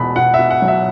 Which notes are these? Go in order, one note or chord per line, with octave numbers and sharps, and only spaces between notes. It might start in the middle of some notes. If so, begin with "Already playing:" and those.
Already playing: E1 E2 B2 B5
B2 F#5
E5
B2
F#5
F#3
E5